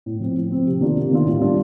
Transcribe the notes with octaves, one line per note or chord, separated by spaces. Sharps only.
A2
F3 C4
A2
F3 C4
C3
D#3 A#3 D4 F4
C3
D#3 A#3 D4 F4
A2
G3 D4 F4